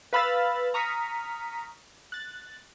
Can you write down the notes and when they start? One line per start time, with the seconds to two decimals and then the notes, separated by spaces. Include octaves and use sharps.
0.13 B4 F5 B5 E6 F6 A6
0.74 A#5 C#6 D#6 F6 B6
2.12 F#6 A6